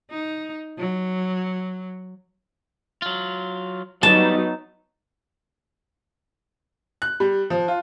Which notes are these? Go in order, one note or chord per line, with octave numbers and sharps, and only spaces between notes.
D#4
F#3
F#3 F4
F#3 G3 B3 D#4 A5
F#6
G3
F3
F4